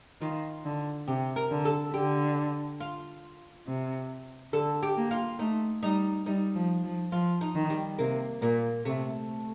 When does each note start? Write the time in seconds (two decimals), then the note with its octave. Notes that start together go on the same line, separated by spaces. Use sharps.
0.21 D#3 F4
0.65 D3
1.08 C3 G4
1.36 A#4
1.51 D3
1.65 A4
1.94 D3 G4
2.80 F4
3.67 C3
4.53 D3 A4
4.83 G4
4.97 A#3
5.11 F4
5.39 A3 D#4
5.83 G3 D#4
6.26 G3 D#4
6.55 F3
6.84 F3
7.12 F3 F4
7.41 D#4
7.55 D#3
7.70 G3
7.98 C3 A#3
8.42 A#2 A#3
8.85 C3 A3